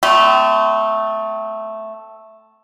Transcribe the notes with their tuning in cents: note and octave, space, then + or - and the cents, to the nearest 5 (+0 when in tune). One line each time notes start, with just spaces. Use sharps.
A3 +0 C4 -40